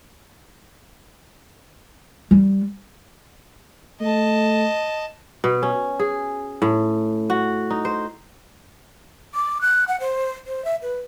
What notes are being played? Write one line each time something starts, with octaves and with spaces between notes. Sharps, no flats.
G3
A3 D#5 A5
B2
C#4
G#4
A2
F#4
D#4
C5
D6
F#6
F#5
C5
C5
E5
B4